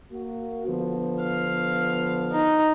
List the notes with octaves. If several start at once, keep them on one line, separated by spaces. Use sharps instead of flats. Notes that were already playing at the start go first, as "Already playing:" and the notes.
A#3 F#4
D3 F3 B3
F5
D#4